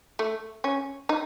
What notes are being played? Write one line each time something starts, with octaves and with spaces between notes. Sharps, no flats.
A3
C#4
D#4